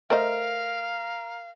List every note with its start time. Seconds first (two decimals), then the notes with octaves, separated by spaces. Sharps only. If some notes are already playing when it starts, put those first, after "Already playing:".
0.10 A3 A#4 C5 D#5 F5